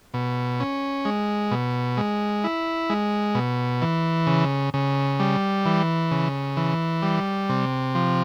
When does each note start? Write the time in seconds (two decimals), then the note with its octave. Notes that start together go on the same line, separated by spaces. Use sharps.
0.14 B2
0.60 C#4
1.05 G#3
1.51 B2
1.97 G#3
2.44 E4
2.90 G#3
3.35 B2
3.82 E3
4.27 C#3
4.74 C#3
5.20 G3
5.65 E3
6.11 C#3
6.57 E3
7.02 G3
7.49 C3
7.95 F3